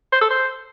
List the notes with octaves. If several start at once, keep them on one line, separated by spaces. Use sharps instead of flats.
C5
A4
C5